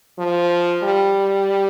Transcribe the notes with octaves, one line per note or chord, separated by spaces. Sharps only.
F3
G3